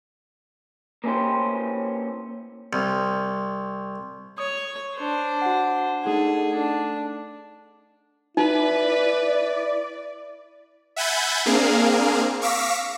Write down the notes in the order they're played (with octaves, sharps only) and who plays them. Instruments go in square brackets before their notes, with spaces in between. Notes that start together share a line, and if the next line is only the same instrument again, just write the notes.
[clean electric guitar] A#3 C4 C#4 E4 G4 C5
[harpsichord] C2
[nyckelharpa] C#5 [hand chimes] D#6
[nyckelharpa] D4 C5
[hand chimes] F#4 F#5
[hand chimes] A3 D#4 F#5 [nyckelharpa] G#4 A4
[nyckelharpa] D4
[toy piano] D#4 [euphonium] E4 [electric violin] B4 [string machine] D5
[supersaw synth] E5 F#5 G#5 B5 G6 A6
A#3 C4 D4 G#4 A#4 F5
F5 C#6 D6 E6 A#6 B6